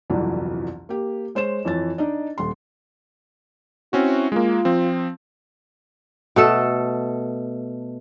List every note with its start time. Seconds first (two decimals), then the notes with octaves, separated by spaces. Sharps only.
0.10 G1 C2 F2 E3 F#3
0.89 A#3 G4
1.35 G#3 C5 C#5 E7
1.65 F2 E3 C#5 A6
1.98 D4 D#4 D5 D#5
2.38 D#1 C6
3.93 C4 C#4 E4 F#4
4.32 G#3 A#3 F4
4.65 F3 C4
6.36 B2 A3 A4